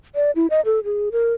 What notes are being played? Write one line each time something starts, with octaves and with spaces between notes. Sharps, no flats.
D5
E4
D#5
A4
G#4
A#4